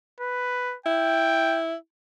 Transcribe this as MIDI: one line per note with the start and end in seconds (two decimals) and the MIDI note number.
0.20 0.76 71
0.86 1.75 64
0.86 1.59 79